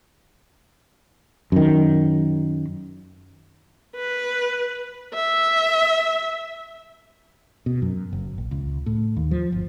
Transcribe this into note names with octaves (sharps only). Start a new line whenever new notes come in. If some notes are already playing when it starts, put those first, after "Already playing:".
F#2 D#3
B4
E5
B2
F#2
F#1
A#1
C#2
A2
D#2
F3
G1